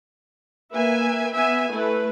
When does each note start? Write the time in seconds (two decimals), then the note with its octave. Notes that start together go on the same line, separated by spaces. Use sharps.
0.71 A#3 B4 E5 G#5
1.34 B3 E5 G#5
1.73 A3 E4 B4